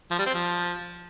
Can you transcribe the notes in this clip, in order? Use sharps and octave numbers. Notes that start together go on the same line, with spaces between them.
F3
G3
C4
F3